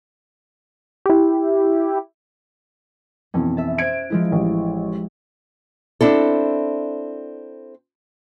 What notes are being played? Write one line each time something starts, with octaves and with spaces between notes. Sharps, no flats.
E4 G4
F2 B2 E3 C#4
E5 A5
C5 F#6 G#6 D7 E7
F3 G#3 E4
A1
C4 D4 E4 A4